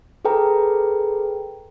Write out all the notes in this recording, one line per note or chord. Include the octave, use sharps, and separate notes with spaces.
G#4 A4 B4 G5 A#5